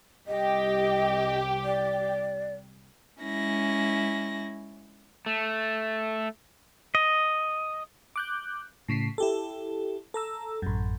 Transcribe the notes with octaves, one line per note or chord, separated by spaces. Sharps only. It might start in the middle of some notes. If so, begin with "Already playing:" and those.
C2 G4 D#5
D5
G#3 C#4 E4 A#6
A3
D#5
D6 F#6 G6
A2 C#3 B6 C7
E4 G4 A4
A4 A#5 E6
A1 F#2